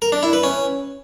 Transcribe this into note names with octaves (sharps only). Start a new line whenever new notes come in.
A#4
D4
E4
B4
C#4